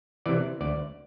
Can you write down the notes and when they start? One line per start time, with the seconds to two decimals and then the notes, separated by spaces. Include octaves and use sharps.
0.26 C3 E3 D5
0.61 D2 D5